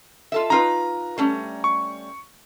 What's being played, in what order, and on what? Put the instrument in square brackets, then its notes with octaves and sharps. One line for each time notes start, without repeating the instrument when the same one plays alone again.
[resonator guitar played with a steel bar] F4 A4 E5
[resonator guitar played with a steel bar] D#4 F4 B4 [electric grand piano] A#5
[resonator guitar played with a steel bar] G3 A3 C#4
[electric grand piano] C#6